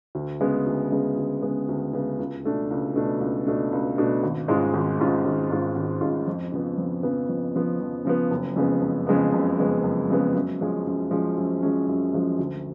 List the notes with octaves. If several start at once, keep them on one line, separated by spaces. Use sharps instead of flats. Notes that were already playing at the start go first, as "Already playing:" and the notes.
D2
C#3 G#3 B3
D2
C#3 G#3 B3
D2
C#3 G#3 B3
D2
C#3 G#3 B3
C#2
B2 A3 D4
C#2
B2 A3 D4
C#2
B2 A3 D4
C#2
B2 A3 D4
G#1
G#2 G#3 C#4 F4
G#1
G#2 G#3 C#4 F4
G#1
G#2 G#3 C#4 F4
G#1
G#2 G#3 C#4 F4
F2
C#3 F3 B3
F2
C#3 F3 B3
F2
C#3 F3 B3
F2
C#3 F3 B3
F#1
F2 C#3 G#3 B3
F#1
F2 C#3 G#3 B3
F#1
F2 C#3 G#3 B3
F#1
F2 C#3 G#3 B3
F#2
F3 G#3 C#4
F#2
F3 G#3 C#4
F#2
F3 G#3 C#4
F#2
F3 G#3 C#4
D2